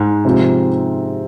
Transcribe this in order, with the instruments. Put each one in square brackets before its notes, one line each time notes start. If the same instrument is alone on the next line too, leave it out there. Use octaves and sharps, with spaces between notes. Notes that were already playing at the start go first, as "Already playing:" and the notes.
Already playing: [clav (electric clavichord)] G#2
[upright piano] C3 F3 G#3 C4 F4